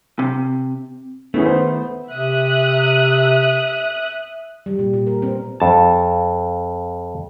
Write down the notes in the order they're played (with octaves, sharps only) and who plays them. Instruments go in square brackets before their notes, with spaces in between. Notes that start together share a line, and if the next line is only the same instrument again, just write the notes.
[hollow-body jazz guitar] C3
[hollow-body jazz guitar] D#3 A3 [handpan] B3 [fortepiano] C#4 E4 G#4
[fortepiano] C5
[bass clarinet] C3 [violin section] E5 D#6 F#6
[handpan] G3
A#2
A#2
A#4
C4
[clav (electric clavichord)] F2 A5